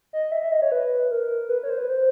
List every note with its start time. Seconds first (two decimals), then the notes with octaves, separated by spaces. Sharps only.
0.13 D#5
0.32 E5
0.42 E5
0.52 D#5
0.62 C#5
0.72 B4
1.11 A#4
1.49 B4
1.63 C#5
1.70 C5
1.79 B4
1.89 C5